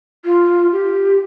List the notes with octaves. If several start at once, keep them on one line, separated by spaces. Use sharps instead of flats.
F4
G4